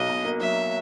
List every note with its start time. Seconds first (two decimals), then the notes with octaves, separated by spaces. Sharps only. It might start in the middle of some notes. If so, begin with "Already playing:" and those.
Already playing: B1 D#5
0.09 B2
0.25 A#3
0.41 F#3 E5